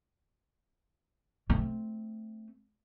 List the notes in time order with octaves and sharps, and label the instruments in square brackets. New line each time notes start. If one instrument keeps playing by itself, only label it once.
[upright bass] A3 C4